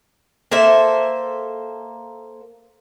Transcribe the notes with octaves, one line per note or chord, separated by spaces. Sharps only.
A#3 A4 C5 E5